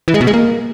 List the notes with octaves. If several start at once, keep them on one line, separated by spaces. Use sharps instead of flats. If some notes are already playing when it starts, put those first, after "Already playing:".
E3
G#3
B2
G#3
A#3